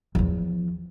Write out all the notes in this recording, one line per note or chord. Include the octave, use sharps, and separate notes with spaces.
E2 F3